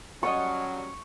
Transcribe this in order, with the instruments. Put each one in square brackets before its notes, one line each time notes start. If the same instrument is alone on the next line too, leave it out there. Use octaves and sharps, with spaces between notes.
[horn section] F#3 G3 C#4 [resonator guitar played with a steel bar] A4 C#5 D#5 [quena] F#5 [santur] C#6